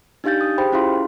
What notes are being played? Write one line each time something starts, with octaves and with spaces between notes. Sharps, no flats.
D4 D#4 G4 F5 G6 A6
D#6
G4 G#4 C5 G5 B5
C#4 E4 F4 G#4 F5 C6